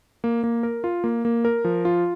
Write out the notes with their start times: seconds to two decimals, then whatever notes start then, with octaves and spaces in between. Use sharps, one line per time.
0.24 A#3
0.44 A#3
0.63 A#4
0.84 F4
1.04 A#3
1.25 A#3
1.45 A#4
1.64 F3
1.85 F4